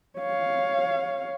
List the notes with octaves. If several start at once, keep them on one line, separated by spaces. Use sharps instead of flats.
C#5 F5